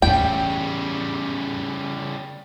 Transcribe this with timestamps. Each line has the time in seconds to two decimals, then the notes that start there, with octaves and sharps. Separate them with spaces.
0.02 E2 A2 C#3 G3 G5